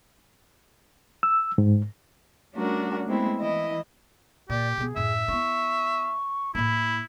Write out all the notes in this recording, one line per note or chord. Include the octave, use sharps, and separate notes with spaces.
E6
G#2
G3 A3 C#4 D4 F#4 A#4
G#3 A3 B3 C4 E4
E3 E4 D#5
A#2 G4 D5
B2 B3 G#4
F#2 A2 E5
B3 E4 C#6
A2 A#3 E4 B5